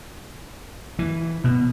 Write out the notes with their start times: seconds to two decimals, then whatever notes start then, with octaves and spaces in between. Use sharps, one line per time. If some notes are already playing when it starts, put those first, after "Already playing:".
0.99 E3
1.44 B2